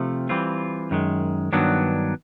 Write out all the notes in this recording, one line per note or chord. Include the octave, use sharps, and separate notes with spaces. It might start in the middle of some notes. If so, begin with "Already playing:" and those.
Already playing: C3 F3 A3
E3 G3 C4 F4
F#2 D#3 G#3
G2 D#3 F#3 B3 D4